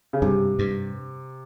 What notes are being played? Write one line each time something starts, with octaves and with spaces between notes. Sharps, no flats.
C#3
G2 C3
G2